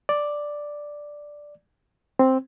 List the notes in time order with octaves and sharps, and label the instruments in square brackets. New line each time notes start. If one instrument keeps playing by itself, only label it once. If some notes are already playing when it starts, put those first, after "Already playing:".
[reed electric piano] D5
C4